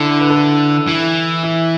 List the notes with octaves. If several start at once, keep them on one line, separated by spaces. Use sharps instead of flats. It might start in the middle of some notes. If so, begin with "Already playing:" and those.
Already playing: D3 E4 A4
B4
E4 A4
E3 E4
E4